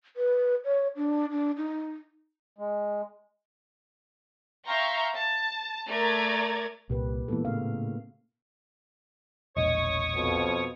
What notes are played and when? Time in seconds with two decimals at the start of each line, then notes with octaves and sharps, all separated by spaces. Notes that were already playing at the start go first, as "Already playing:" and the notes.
0.16 B4
0.65 C#5
0.96 D4
1.31 D4
1.57 D#4
2.58 G#3
4.67 E5 F5 G5 A#5 C6 C#6
5.16 A5
5.88 A3 A#4 D5 A#5 G#6 A6
6.90 C2 A#2 G4 B4
7.28 G#2 E3 A#3 B3 A4
7.45 A2 C#3 F5
9.57 E1 A#1 C#5 D#5 C#6 D#6
10.15 F2 B2